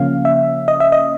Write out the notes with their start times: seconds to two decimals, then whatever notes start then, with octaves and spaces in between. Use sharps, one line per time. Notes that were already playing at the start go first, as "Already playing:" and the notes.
Already playing: C#3 F3 A#3 C#4 F5
0.25 E5
0.68 D#5
0.80 E5
0.92 D#5